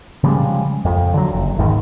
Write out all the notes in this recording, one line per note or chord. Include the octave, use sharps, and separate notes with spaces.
C#3 F3 G3 G#3
F2
D3 F#3
F#1
F#1 E2 G#2 D#3